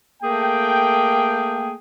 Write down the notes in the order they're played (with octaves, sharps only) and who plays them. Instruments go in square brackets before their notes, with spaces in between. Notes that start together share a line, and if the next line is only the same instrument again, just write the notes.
[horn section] A3 A#3 G#4 G5